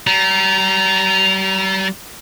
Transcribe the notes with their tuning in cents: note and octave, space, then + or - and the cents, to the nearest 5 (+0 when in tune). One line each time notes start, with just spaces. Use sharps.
G3 -40 A#5 +0